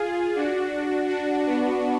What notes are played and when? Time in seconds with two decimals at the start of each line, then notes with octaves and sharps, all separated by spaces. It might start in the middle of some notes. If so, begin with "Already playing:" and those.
Already playing: F4 G#4
0.35 D4 F#4
1.09 D4 F#4
1.46 B3 D4